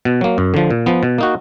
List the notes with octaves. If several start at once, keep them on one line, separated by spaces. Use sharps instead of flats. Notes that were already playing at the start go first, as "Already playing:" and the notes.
B2
F#3 A#3
F#2
D3 F3
A#2
F3 B3
B2
A#3 D#4 F#4